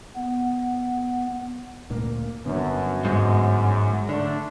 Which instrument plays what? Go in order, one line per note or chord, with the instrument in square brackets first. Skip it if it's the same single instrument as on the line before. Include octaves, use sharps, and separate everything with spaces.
[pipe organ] B3
[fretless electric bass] D2 A#2 A#3
[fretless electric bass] G1 D3 B3 [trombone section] F#2
[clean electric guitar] G#2 G#3
[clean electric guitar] D3 [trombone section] A3 D4